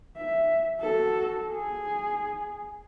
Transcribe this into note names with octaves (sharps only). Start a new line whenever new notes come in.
E5
F#4 A4
G#4